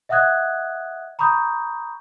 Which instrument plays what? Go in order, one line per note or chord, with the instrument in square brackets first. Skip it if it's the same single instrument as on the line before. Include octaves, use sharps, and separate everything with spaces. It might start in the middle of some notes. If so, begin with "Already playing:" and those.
[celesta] D#5 E5 F#5 D#6 F#6 G#6
A#5 B5 C#6 D#6 G6